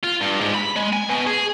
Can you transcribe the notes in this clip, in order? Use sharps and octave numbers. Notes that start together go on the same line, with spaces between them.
F4
G2
G#2
B5
G#3
G#5
B2
G#4